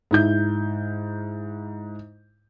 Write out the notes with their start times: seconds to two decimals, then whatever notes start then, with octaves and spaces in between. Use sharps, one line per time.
0.11 G#2 E4 G6